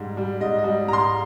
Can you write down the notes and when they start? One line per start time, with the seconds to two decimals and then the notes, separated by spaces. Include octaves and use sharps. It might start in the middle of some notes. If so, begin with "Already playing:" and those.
Already playing: G#2 G3
0.17 G3
0.41 G#2 D#5
0.58 D#5
0.64 G3
0.88 G#2 A#5
0.93 C6